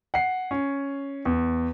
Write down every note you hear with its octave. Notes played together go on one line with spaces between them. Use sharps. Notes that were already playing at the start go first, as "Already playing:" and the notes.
F#5 C7
C#4
E2